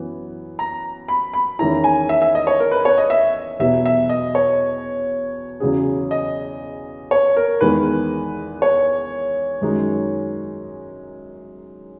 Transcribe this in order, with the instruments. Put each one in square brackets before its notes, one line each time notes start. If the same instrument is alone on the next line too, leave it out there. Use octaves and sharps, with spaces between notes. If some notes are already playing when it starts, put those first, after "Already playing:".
Already playing: [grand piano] F#2 E3 B3
[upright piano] A#5
B5
B5
[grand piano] E2 D#3 A#3 C#4 E4 [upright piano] A#5
[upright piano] G#5
E5
E5
D#5
C#5
A#4
B4
C#5
D#5
E5
[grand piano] E2 B2 F#3 B3 [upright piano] E5
[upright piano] E5
D#5
C#5
[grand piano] E2 C#3 F#3 C#4 G#4
[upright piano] D#5
C#5
A#4
[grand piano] E2 D#3 G#3 B3 [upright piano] B4
[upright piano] C#5
[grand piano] F#2 D#3 G#3 D#4